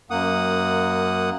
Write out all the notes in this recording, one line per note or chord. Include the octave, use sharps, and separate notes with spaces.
F#2 A#3 F#5 D#6